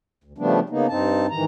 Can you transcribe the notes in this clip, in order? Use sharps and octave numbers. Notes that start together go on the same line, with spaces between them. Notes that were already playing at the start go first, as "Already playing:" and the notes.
D2
C#3 F3 G3 A3 B3 D4
C#3 A#3 B3 D#4
G2 C4 D#4 A5
G#2 D#3 E3 A#5